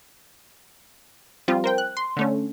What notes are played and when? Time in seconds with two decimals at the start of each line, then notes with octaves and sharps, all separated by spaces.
1.48 F3 G3 C4 F4
1.64 A#4 C5 G5
1.78 F#6
1.97 C6
2.17 D3 A3 C#4